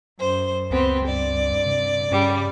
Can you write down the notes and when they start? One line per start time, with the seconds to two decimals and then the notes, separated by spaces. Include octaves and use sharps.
0.19 F#2 C5
0.71 C#2 B3 C4 G4 C5
1.06 G2 D5
1.66 C3
2.11 G2 C#3 G3 D6